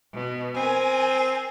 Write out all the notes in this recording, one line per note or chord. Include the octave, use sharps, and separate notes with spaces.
B2
C4 A#4 G#5